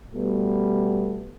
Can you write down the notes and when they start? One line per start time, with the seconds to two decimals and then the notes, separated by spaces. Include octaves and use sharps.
0.15 B2 G3 A3 B3